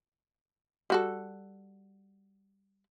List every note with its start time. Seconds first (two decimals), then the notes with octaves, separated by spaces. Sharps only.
0.90 G3 F#4 A4